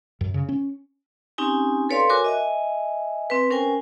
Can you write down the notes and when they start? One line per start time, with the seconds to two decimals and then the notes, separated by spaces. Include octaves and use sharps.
0.21 F#2
0.34 C#3
0.49 C#4
1.38 C4 C#4 D#4 G4 G#5
1.89 A4 B4 C#5 D5 F5 C6
2.10 F#4 A#4 G#5 D6
2.24 D#5 E5 G#5
3.30 C4 B4
3.50 C#4 A#4 C5 G5 G#5